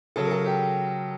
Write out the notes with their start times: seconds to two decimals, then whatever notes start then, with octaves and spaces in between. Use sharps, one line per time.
0.16 C#3 F#3 A4
0.25 A#4
0.31 A4
0.46 G4